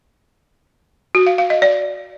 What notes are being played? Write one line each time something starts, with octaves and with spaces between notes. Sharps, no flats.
F#4
F5
F5
D#5
D5